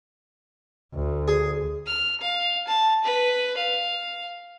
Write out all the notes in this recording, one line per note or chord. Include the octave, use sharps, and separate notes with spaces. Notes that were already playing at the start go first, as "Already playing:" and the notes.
D2
G#4
F6
F5
A5
B4
F5